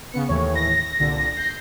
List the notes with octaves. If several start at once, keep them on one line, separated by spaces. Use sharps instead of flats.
C#3 B3 C#7
D#2 A2 E3 C#5
A#6
C2 A#2 D3
G6 C7